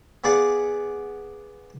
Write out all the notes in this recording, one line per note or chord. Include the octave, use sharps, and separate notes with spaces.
B3 G#4 B4 D5 F5 F#5